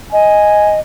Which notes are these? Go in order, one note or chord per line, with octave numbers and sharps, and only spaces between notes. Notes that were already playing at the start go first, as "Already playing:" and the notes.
D#5 G#5